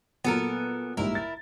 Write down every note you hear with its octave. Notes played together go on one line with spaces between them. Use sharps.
A#2 F#3 B3 A4 A#4
A#1 G#2 G3 E4 A#4
A6